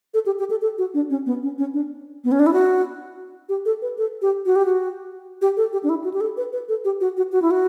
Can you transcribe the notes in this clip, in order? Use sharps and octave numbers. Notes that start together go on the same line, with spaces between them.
A4
G4
G4
A4
A4
F#4
D4
C#4
B3
C#4
C#4
D4
B3
C#4
D4
E4
F#4
G4
A4
B4
A4
G4
F#4
G4
F#4
G4
A4
G4
D4
E4
F#4
G4
A4
B4
B4
A4
G4
F#4
F#4
F#4
E4
F#4